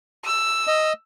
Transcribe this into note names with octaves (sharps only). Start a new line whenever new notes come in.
E6
D#5